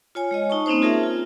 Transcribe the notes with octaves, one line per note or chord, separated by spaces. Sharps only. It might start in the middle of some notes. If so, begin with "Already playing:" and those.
F4 C#5 G#5
G#3 C#5 D#5
D#4 A5 C#6
A#3 C4 C#4 D#4 C5
F4 G#4 A#4 E5 A5
F4